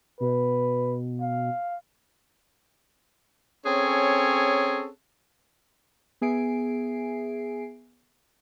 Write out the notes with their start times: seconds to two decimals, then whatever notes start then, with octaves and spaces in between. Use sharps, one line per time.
0.20 B2 B4
1.22 F5
3.66 C4 C#4 G#4 A4 C#5
6.21 B3 G#4 E5 G#5 C7 D7